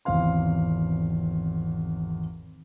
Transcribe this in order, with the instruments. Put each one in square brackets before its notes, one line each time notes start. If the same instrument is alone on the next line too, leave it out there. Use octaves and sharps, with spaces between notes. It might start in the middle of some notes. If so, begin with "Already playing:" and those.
[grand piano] G#1 E2 C3 C5 F5 C6